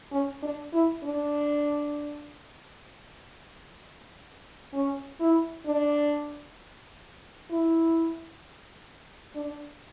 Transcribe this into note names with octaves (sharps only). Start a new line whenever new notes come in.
C#4
D4
E4
D4
C#4
E4
D4
E4
D4